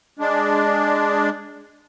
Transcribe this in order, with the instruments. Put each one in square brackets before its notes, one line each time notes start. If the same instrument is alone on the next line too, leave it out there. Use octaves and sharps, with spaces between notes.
[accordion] G#3 D4